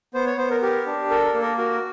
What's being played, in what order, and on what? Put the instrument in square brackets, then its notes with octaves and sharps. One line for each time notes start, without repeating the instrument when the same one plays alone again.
[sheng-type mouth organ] B3 C5
C#5
B3 C5
A#4
G4 A#4
D4
A4 A#4
A#4
A#3
A#4
F#4 A#4